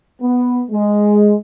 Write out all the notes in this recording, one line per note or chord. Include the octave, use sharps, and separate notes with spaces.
B3
G#3